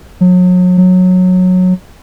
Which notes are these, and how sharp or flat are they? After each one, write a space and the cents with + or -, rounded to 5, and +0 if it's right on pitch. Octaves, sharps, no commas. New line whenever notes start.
F#3 -35
F#3 -15